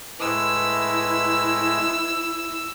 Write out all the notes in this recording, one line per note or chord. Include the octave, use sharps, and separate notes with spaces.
A2 G#3 E4 B4 E6